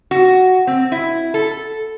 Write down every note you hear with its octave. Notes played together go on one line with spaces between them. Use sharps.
F#4
C4
E4
A4